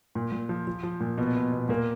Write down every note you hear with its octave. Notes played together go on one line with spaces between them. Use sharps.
A#2
A#2
F3
F3
F3
A#2
B2 B3
B2
B2
A#2 A#3